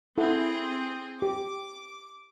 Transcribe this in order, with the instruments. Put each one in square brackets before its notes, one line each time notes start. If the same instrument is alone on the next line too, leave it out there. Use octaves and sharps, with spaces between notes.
[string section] C4 G#4 [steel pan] E4 A4 F#5
[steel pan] G4 [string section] D6